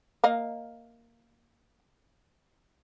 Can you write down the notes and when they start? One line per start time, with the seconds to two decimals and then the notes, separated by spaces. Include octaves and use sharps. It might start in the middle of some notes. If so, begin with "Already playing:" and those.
0.24 A#3 D#5 F5